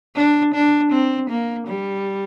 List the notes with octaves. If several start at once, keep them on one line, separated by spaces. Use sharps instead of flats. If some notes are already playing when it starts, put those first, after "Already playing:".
D4
D4
C4
A#3
G3